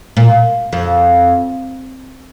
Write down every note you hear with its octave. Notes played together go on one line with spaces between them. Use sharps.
A#2
F2